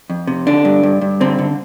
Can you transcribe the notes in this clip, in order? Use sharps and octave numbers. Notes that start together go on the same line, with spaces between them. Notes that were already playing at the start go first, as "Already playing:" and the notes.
F2
C3
D3 D4
G2
G2
G2
D3 C4
D3